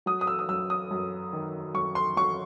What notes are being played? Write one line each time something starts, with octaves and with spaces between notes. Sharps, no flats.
F#3 D#6
D#6
E6
D#6
F#2 E6
D#6
F#2
D#3
F#2 C#6
C6
F#3 C#6